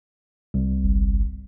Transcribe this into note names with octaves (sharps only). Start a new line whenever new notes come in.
C2
G1